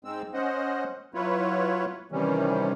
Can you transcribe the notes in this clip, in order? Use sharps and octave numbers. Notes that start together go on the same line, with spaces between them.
G#2 G#3 C4 E6
C#4 C5 D#5 F#5
F#3 E4 F4 B4 C#5
C3 D#3 E3 G3 C#4